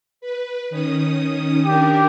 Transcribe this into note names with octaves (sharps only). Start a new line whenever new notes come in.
B4
D#3 C#4 D#6
D4 G4 A#4